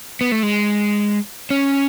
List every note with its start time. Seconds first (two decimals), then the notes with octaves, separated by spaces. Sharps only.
0.21 B3
0.32 A3
0.43 G#3
1.50 C#4